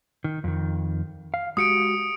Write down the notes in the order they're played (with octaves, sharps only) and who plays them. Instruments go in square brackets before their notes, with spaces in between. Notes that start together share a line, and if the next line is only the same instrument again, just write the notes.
[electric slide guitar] D#3
F2 D#3
F5
[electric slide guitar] G#3 F#4 G4 [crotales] D#6 C#7 D7